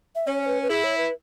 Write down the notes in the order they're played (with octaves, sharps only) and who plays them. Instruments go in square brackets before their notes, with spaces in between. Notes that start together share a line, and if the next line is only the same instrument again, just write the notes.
[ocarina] E5
[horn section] C#4 [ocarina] C#5
[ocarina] C#5
B4
B4
[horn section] E4 [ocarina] G#4
[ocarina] C#5
B4